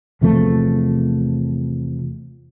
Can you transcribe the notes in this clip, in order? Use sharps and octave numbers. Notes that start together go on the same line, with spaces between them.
E2 C3 F3 A3